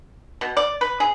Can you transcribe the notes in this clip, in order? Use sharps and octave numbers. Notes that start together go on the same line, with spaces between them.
B2
D5
B4
G#4